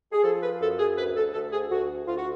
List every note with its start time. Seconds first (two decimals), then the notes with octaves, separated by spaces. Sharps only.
0.12 G#4
0.24 F3 A4
0.43 B4
0.61 F#2 A4
0.78 G#4
0.97 D2 B4
1.16 A4
1.34 D2 A4
1.52 G#4
1.70 D2 F#4
2.08 D2 F4
2.18 F#4